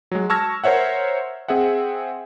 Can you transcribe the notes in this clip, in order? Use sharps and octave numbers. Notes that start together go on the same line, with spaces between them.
F#3 G#3
A5 C#6 E6 F6 G#6 A#6
A#4 C5 C#5 E5 F#5
C4 G#4 E5 F#5